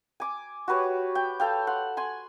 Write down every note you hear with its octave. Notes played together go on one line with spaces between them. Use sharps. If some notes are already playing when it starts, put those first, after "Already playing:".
G#5 D6
F#4 G4 B4 C#5
G5
A4 F5 G5
F#5 C6
G#5 C6